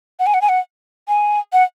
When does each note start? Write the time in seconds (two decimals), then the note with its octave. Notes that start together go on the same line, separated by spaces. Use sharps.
0.19 F#5
0.27 G#5
0.34 F#5
0.42 G#5
0.49 F#5
1.08 G#5
1.53 F#5